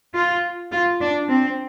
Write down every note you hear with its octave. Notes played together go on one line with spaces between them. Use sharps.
F4
F4
D4
C4